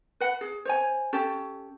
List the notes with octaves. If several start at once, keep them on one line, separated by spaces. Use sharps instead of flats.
B4 F#5
G#4
C5 C#5 G#5
C#4 G4 A4